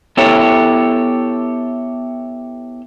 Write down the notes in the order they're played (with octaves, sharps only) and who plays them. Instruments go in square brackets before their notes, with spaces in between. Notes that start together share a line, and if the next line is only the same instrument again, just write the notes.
[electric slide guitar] B3 E4 G4 A4 C#5